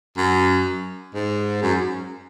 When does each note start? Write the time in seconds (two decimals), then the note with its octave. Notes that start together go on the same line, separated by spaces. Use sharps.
0.17 F#2
1.15 G#2
1.62 F#2